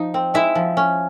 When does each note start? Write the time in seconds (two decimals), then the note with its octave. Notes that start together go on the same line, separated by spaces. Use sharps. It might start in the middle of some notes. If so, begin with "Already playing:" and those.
Already playing: F3 D#4
0.14 C4
0.34 G#3 E4 E5
0.55 F3
0.77 C#4